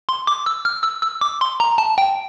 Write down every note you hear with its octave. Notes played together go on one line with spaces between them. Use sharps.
C6
D6
E6
F6
E6
E6
D6
C6
A#5
A5
G5